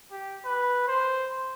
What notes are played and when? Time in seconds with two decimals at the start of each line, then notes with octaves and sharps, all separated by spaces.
0.11 G4
0.45 B4
0.88 C5